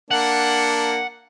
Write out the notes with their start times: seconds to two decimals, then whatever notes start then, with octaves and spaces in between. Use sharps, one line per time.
0.11 A#3 D4 F#5